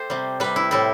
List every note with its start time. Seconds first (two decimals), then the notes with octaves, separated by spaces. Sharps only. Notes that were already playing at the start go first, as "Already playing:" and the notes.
Already playing: A3 G4 A4 C5
0.10 C3 G3
0.40 C3 G3 B4
0.56 E4
0.71 A2 G3 E4